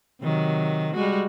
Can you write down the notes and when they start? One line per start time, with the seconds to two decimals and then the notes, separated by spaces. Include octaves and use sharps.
0.21 C3 D#3 F#3
0.94 G3 G#3 F#4